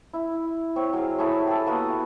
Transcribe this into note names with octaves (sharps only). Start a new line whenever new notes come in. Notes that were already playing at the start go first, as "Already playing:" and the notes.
E4
C4 C#5
F#3 G#4 F5
E4 G#4 A4 C#5
G4 A4
A#3 B3 F#4 D#6